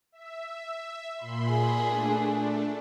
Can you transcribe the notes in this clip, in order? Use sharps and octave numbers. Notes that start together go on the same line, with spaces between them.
E5
A#2 B5 C6
G#4
A3 D4